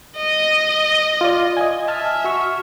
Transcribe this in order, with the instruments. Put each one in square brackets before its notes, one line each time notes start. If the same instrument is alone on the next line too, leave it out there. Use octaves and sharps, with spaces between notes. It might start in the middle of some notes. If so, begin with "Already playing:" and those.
[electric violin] D#5
[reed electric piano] F4 D5
D#5 G#5
[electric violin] E5 [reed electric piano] G#5 A5 F6
[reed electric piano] F#4 C#6 F6